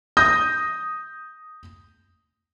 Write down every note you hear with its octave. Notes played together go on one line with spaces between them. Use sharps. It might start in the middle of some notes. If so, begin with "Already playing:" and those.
D#6 G6 A#6